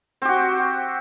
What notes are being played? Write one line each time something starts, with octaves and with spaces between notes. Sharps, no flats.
C4 F#4 G4